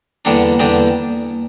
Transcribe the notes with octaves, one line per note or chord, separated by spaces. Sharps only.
E2 D3 G3 A#3 D4
E2 D3 G3 D4